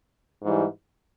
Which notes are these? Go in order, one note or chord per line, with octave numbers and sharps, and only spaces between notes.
G#2 E3 G3